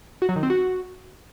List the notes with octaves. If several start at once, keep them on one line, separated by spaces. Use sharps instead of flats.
F#4
F#3
D#3
C4
F#4